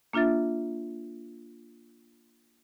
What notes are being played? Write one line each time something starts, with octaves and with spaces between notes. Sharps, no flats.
A#3 D4 F4 E5 A6